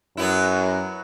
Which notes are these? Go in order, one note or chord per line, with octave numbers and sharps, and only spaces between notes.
F#2 F#3 B3 E4